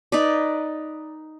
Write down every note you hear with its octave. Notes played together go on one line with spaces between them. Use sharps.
D#4 B4 D5